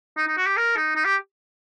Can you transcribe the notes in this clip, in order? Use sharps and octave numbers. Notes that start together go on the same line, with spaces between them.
D#4
D#4
F#4
G4
A#4
D#4
D#4
G4